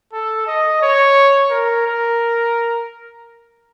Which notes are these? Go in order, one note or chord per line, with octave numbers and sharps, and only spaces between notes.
A4
D#5
C#5
A#4
A#4